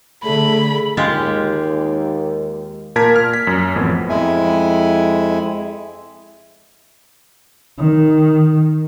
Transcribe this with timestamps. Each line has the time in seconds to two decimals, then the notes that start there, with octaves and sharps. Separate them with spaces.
0.24 D3 A3 G#4 B5
0.97 D#2 G#3 F4 G4
2.96 A#2 A#4 A5 G#6 B6
3.16 F6
3.33 B6
3.47 F#2
3.75 A1 F2 B3
4.09 F2 G#3 E4 G#5
7.78 D#3